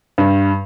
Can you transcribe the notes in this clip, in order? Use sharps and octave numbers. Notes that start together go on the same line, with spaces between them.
G2